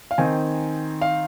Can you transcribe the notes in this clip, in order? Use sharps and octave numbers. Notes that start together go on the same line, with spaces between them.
F5
D#3 C4 D#4 G#5
F5